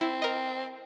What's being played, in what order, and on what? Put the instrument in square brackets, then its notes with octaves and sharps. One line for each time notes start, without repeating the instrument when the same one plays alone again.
[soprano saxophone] C4 [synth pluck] E4
[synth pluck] A#4 D#5